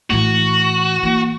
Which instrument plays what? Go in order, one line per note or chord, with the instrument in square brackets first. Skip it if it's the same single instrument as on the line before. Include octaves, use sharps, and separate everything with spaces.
[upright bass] A2 E3 [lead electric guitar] F#4
[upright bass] E3 A#3